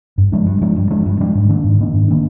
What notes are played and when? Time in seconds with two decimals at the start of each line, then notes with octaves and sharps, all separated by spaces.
0.18 G2
0.32 F3 G#3 D4
0.47 G2
0.61 F3 G#3 D4
0.76 G2
0.90 F3 G#3 D4
1.06 G2
1.20 F3 G#3 D4
1.35 G#2
1.49 D#3 A#3 D4
1.64 G#2
1.79 D#3 A#3 D4
1.93 G#2
2.08 D#3 A#3 D4